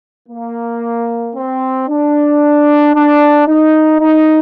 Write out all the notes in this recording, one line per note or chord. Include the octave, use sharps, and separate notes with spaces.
A#3
C4
D4
D4
D#4
D#4